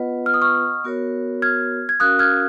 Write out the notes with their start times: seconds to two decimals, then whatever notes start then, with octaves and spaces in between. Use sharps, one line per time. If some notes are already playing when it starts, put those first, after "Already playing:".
Already playing: B3 F4 B4 D#5 F#5
0.26 F6
0.34 D#6
0.42 C#6 F6
0.84 B3 F#4 A#4 C#5
1.42 F6 G#6
1.89 G#6
2.00 C#4 F#4 A#4 F5 D#6 F#6
2.19 F6 G#6